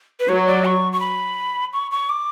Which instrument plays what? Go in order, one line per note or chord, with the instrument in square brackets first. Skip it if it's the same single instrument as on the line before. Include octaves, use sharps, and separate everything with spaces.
[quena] B4
[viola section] F#3 [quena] C#5
[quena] D5
C#6
C#6
B5
C#6
C#6
D6